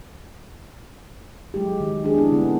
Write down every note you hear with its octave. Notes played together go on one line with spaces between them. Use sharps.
F#3 G#3 G4
D#3
C#4 D4 G#4
B3 C4 D4 E4
D3 G#3 B3